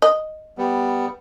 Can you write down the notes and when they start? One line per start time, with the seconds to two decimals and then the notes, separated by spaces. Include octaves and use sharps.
0.02 D#5
0.58 G3 B3